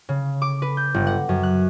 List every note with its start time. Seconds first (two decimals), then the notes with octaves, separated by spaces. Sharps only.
0.09 C#3
0.42 D6
0.62 B4
0.77 G6
0.94 G1
1.07 F#5
1.29 F#2
1.43 F#6